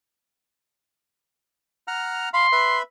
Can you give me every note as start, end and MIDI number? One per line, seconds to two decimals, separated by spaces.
1.88 2.29 78
1.88 2.29 82
1.88 2.29 89
2.33 2.47 77
2.33 2.47 83
2.33 2.79 84
2.52 2.82 71
2.52 2.82 76
2.52 2.82 83